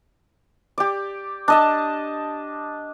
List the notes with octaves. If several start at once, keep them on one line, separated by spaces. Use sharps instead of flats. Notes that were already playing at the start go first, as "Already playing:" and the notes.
G4 D5
D4 D#5 A5